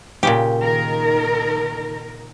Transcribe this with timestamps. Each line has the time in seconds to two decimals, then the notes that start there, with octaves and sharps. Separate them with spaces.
0.23 A#2 C#3 G4
0.62 D#3 A#4